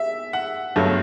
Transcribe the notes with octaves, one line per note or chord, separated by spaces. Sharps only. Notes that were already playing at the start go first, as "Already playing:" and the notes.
Already playing: E5
F#5
G1 G2 F#3 A3